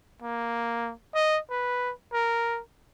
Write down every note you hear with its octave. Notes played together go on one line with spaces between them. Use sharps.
A#3
D#5
B4
A#4